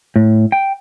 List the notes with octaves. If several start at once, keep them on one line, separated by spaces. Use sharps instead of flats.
A2
G5